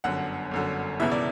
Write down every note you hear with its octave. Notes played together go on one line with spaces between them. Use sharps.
G1 F#2 D3 F#5
G1 F#2 D3
E1 E2 C#3 E3 E5
D5